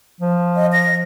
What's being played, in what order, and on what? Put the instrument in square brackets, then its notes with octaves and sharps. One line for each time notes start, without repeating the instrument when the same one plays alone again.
[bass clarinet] F3
[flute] D#5
A#6